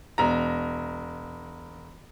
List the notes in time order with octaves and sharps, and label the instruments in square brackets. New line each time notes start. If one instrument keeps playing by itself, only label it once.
[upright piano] E1 A#5